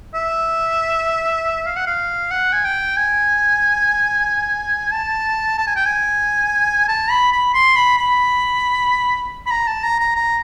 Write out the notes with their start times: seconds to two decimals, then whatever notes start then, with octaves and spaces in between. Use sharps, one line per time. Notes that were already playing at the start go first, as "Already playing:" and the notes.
0.14 E5
1.66 F5
1.76 F#5
1.87 F5
2.31 F#5
2.53 G#5
2.65 G5
2.97 G#5
4.92 A5
5.58 A5
5.67 G#5
5.76 G5
5.86 G#5
6.88 A5
7.10 B5
7.33 B5
7.54 C6
7.76 B5
7.98 B5
9.46 B5
9.51 A#5
9.67 A5
9.84 A#5
9.99 A#5
10.16 A#5